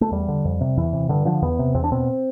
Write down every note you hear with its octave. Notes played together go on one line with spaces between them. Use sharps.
A3
E2 G3
D3
F2
C3
E2 E3
C3
G2 D3
D3 F3
E2 B3
C3
E2 C4
D4
B2 C4